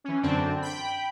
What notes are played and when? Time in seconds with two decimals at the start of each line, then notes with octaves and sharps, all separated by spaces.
0.04 E3 C#4
0.22 F#2 D3 C4 D4
0.62 G5 B5